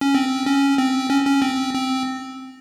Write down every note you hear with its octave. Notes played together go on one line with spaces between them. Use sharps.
C#4
C4
C#4
C4
C#4
C#4
C4
C4